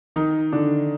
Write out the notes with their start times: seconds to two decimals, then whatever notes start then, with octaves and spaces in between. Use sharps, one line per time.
0.16 D#3 D#4
0.52 D3 D4